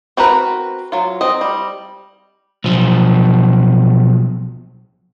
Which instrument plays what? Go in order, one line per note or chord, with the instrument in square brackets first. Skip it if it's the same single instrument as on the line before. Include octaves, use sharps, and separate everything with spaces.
[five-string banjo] C4 F#4 A#4 B4
F#3 F4
C4 D#5
G3
[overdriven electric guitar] B1 F3